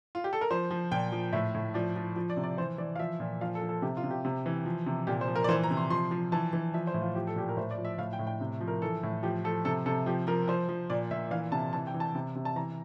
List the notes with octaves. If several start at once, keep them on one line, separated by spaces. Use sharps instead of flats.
F4
G4
A4
A#4
F3 C5
F3
A#2 G5
F3
A2 E5
A2
F3 D5
F3
F3
D5
C3
D5
E3 C5
E3 D5
F5
F3 E5
A#2
F3 F5
A4
F3
A4
C3 G4
F4
C3
G4
C3
E3
F3
C3
A#2 G4
C5
F3
A#4
D5
E3 C5
A#5
C3
C6
F3 C6
F3
E3 A5
E3
F3 E5
C5
A2
F4
F3 G4
A4
A#2 G4
A#4
A2 C5
D5
F3
E5
A2 F5
G5
A2
G5
C3
F3
A#4
E3 A4
A2
F3 G4
F3 A4
C3 A4
C3 A4
F3 G4
F3 A#4
F3 C5
F3
A#2 D5
A#2 E5
E3 F5
C3 A5
E3 A5
G5
E3
A5
C3
C3
A5
E3 A#5